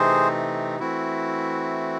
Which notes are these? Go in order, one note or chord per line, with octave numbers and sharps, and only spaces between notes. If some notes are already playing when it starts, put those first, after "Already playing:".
Already playing: C3 E3 A3 C4 D#4 G#4 C5
E3 A3 C4 E4 F#4